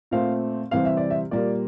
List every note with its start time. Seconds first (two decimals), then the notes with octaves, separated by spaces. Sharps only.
0.11 A#2 A3 C4 F5
0.71 C3 E3 G3 C4 F5
0.85 E5
0.97 D5
1.10 E5
1.31 A#2 G3 A#3 D5